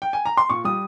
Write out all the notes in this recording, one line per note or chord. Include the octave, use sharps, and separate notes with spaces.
G5
G#5
A#5
C6
A#2 C#6
G3 D#6